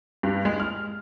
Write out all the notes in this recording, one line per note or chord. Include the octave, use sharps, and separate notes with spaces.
G2
G#3
F6